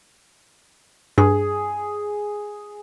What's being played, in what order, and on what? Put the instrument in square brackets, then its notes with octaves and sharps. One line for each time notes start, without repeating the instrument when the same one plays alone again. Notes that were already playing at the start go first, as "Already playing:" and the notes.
[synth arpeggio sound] G2 [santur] G#4